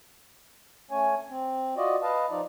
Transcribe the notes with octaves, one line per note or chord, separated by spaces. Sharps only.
A3 C#4 C#5 G#5
C4
F4 F#4 D5 D#5
B4 D#5 F5 A5
F3 D#4 F4 D5